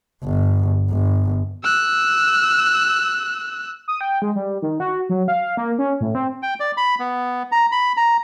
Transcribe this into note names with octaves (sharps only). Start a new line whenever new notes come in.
G1
G1
E6 F#6
D#6
G5
G#3
G3
D#3
F#4
F#3
F5
A#3
C#4
A2
C4
G5
D5
B5
B3
A#5
B5
A#5